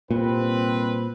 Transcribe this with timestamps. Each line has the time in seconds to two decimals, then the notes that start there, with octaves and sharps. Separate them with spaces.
0.11 C2 A#2 C4 B4